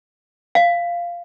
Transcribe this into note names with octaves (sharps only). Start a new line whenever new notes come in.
F5